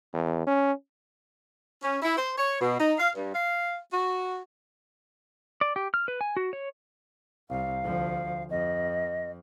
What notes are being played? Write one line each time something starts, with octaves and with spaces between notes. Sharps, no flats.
E2
C#4
C#4
E4
C5
C#5
B2
D#4
F5
G2
F5
F#4
D5
G4
F6
B4
G#5
F#4
C#5
C2 F5
D2 F3
F2 D#5